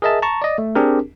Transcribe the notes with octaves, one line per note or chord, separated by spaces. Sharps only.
G#4 A#4 D#5 E5 A5
A5 A#5 C#6
D5 D#5
A3
C4 D4 G4 G#4 A#4